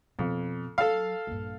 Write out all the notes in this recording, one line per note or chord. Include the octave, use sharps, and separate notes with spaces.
F2 B2
F#3 A4 F5
A#1 G2